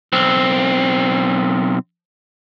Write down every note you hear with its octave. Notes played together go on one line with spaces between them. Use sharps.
B1 C4